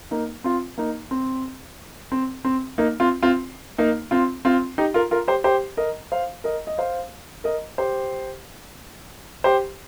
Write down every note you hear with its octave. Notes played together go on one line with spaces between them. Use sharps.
A#3 D#4
C4 F4
A#3 D#4
C4
C4
C4
A#3 D#4
C4 F4
C4 F4
A#3 D#4
C4 F4
C4 F4
D#4 G4
F4 A#4
F4 A#4
G4 C5
G4 C5
A#4 D#5
C5 F5
A#4 D#5
D#5
C5 F5
A#4 D#5
G4 C5
G4 C5